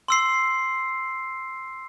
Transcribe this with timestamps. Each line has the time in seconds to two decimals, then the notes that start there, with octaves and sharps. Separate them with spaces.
0.08 C6 E6 C7